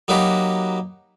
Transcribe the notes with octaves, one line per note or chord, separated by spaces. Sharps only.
F#3 A#3 D#4 F#4 G4 B4